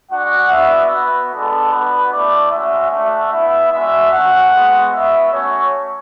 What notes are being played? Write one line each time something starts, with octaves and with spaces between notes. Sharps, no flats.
G#3 D4 F#4 F#5
B3 D4 F#4 E5
B3 F#4 B4
G#3 B3 D4 A4
B3 D4 F#4 B4
A3 E4 D5
G#3 C#4 F#4 E5
A3 D4 F#4 E5
B3 E4 E5
G#3 D4 F#4 E5
A3 C#4 F#4 F#5
G#3 B3 F#4
B3 F#4 E5
A3 C#4 F#4 C#5